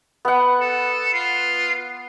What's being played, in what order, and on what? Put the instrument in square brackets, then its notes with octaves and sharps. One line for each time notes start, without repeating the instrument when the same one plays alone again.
[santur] B3 F#5
[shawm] A4
F4